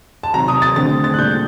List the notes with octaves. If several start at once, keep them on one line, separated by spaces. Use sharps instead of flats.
A5
C3 D#3 F#3 A#5
D#6
A6
D3 A3 C4 A6
A6
F#6
A#2 G3 D4 G6